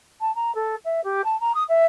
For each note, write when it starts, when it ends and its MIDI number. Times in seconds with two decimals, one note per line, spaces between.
0.20 0.34 81
0.35 0.54 82
0.55 0.75 69
0.85 1.01 76
1.04 1.21 67
1.24 1.38 81
1.40 1.52 82
1.54 1.63 87
1.69 1.86 76